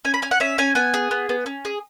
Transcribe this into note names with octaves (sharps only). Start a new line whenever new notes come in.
C#4 G#5
B5
C#4 G#5
F#5
C#4 E5
C#4 G#5
B3 G#5
G#4
B3
B3
C#4
G#4